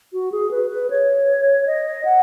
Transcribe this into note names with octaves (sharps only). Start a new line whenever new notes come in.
F#4
G#4
B4
B4
C#5
D#5
F#5